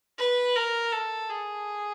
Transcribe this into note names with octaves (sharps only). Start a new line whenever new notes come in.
B4
A#4
A4
G#4